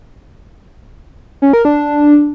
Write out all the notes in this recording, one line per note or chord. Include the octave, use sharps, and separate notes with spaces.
C#4
A#4
D4